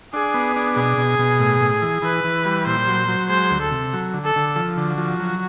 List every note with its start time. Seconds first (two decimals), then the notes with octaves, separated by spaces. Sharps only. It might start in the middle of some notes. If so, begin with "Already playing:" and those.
0.13 D4 G#4
0.34 B3
0.56 D4
0.76 B2 G#4
0.98 B2
1.19 B2
1.40 A2
1.61 A2
1.82 E3
2.03 E3 B4
2.24 E3
2.45 G3
2.66 A#2 C5
2.87 F#3
3.08 F#3
3.29 G#3 C5
3.51 D2
3.61 A4
3.71 C3
3.93 F#3
4.14 D3
4.25 A4
4.36 D3
4.56 F3
4.77 D3
4.88 F#4
4.98 F3
5.19 F#3